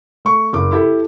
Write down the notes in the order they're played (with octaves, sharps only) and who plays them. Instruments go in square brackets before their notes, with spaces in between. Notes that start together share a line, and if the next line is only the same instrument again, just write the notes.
[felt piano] A3 C#6
F#1 D6
E4 G4 A4